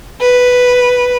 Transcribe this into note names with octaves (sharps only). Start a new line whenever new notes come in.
B4